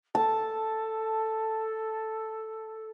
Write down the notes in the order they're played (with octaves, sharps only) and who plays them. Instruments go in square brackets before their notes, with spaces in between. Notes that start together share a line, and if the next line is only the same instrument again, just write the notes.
[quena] A4 [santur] A5